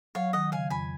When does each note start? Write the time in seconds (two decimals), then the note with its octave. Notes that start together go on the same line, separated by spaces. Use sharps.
0.15 F#3 C#5 F5
0.33 D#3 D#5 F#5
0.52 C#3 F5 G#5
0.70 F2 G#5 B5